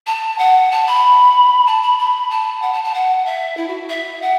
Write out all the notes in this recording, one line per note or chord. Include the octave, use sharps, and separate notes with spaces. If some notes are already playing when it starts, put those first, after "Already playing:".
A5
F#5
A5
B5
A5
B5
B5
A5
F#5
A5
A5
F#5
E5
E4
F#4
E5
F#5